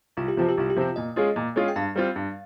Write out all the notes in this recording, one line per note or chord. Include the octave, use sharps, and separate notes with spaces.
C2 F4
G4
C3 F3 C4 F4
G4
C2 F4
G4
C3 F3 C4 F4
A#2 D#5
G#3 C#4 F4 G#4
A#2
G#3 C#4 F4 G#4
G5
G2 F5
G3 C4 F4
G2